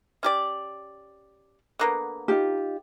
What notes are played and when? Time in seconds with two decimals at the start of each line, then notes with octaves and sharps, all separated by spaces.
0.23 C#4 G4 D5
1.79 D3 A#3 B3
2.28 D#4 F4 G4